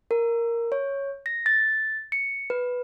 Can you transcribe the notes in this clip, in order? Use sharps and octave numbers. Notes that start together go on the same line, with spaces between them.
A#4
C#5
A#6
A6
C#7
B4